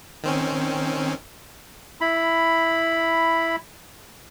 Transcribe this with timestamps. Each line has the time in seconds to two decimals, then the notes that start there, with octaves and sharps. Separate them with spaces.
0.24 D#3 C4 C#4
2.01 E4 B5